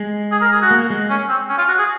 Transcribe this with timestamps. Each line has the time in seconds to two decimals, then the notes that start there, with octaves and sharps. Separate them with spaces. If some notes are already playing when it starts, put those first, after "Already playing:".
Already playing: G#3
0.31 G#4
0.42 A#4
0.52 G#4
0.61 F#4
0.71 A#3
0.90 G#3
1.10 C#4
1.29 C4
1.49 C#4
1.58 F4
1.68 F#4
1.78 G#4